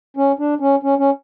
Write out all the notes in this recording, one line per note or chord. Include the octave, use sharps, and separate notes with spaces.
C#4
D4
C#4
C#4
C#4